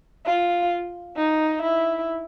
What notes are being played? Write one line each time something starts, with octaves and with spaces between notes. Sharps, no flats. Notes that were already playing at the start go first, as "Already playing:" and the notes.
F4
D#4
E4